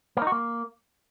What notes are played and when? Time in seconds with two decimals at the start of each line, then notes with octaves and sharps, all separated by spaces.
0.17 A#3
0.22 D#4
0.27 F#4
0.32 A#3